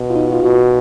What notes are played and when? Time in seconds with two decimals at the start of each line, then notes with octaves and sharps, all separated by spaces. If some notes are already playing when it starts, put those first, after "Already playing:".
Already playing: B2
0.10 F4
0.15 D#4
0.32 F4
0.43 B2 F#4